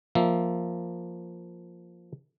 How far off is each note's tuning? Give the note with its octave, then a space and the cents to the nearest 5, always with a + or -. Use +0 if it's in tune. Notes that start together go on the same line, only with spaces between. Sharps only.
F3 +0 A#3 +0 E5 +0